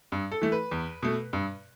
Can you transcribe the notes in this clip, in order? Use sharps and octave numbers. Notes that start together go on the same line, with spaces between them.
G2
A4
E3 A3
B4
E2
B2 A3
G2